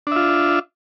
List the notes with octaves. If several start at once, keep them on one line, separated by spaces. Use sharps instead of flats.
D4 F4 E5